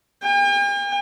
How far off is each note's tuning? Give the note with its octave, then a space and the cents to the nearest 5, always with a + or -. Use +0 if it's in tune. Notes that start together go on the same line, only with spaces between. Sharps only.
G5 +45